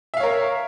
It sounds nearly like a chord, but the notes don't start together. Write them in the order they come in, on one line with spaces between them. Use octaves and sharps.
E5 F5 C#5 A#4